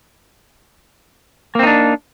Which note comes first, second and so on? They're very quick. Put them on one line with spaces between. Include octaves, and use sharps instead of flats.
A#3 C4 D#4 D4